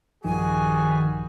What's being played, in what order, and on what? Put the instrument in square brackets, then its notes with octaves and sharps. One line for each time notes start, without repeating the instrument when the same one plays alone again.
[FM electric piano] A#1 G2 F3 [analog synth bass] D#3 [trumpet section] G3 F#4 G#4 [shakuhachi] G#5